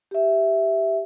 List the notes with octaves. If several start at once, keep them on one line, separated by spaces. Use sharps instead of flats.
G4 E5